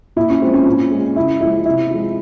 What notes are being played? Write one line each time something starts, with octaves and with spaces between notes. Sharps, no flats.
A#2 E4
C#4
F3 G#3 C4
C#4
A#2
G#3
C#3 E4
F3 G#3 E4
C3 E4
F3 G#3